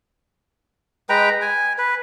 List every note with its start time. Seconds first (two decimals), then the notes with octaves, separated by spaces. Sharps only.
1.09 G#3 B4 G5 A#5
1.42 G#5
1.78 B4